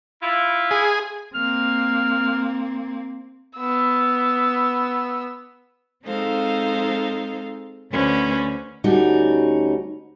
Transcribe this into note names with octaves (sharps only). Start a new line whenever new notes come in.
E4 F4
G#4
A#3 C4 F6
B3 E6
G#3 C4 D#4 A4 C5 F5
D2 D3 A3 C#4 B4 C5
D2 G3 C#4 D#4 F#4